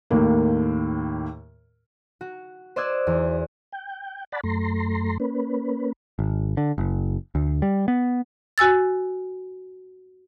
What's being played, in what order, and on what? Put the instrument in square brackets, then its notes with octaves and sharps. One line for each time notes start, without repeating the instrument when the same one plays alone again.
[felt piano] D#2 A2 A#3
[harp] F#4
C5 D5 D#5 E6 F#6 G#6
E2
[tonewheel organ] G5
D5 F#5 A5 B5
F#2 A3 A#5 C6
A#3 C#4 B4
[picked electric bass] G#1
D3
F#1
D2
G3
B3
[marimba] F#4 G#5 E6 A6